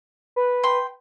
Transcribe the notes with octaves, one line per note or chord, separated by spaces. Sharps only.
B4
G5 C6